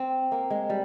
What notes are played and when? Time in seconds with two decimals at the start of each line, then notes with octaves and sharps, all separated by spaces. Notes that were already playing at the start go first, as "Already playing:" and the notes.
Already playing: C4
0.32 A#3
0.50 G#3
0.70 G3